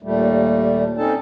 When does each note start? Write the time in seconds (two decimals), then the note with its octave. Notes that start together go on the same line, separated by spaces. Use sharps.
0.02 D#2 A#2 G3 A3
0.98 C4 C#4 D#4 A4 A5